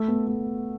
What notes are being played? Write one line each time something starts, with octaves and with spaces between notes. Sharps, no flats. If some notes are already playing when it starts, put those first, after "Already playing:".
Already playing: A3
B3
A3